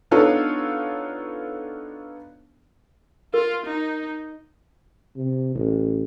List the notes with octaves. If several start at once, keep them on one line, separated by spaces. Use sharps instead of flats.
B3 D4 D#4 F4 A4 C#5
F4 A#4
D#4
C3
A1